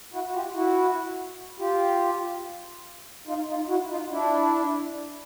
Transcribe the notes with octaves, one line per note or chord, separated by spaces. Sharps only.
E4 F#4
F#4
F4 G4
E4 F#4
F4 G4
D#4 F4
D#4 F4
E4 F#4
D#4 F4
D4 E4